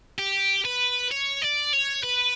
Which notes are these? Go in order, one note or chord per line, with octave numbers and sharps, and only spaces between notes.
G4
B4
C#5
D5
C#5
B4